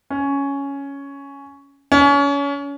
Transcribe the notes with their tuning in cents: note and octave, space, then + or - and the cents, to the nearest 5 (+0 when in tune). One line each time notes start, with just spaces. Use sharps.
C#4 +5
C#4 +30